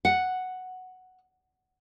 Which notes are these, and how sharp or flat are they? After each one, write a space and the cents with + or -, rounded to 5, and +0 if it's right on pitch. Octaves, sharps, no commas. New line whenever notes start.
F#5 +0